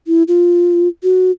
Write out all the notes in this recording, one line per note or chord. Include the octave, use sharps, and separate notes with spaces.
E4
F4
F#4